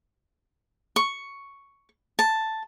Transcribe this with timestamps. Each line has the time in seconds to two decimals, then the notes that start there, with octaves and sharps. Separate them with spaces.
0.96 C#6
2.19 A5